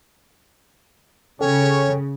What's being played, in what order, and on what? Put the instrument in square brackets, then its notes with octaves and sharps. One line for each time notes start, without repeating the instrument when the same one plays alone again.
[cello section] C#3 [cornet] C#4 [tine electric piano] A4 G5 [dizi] C#5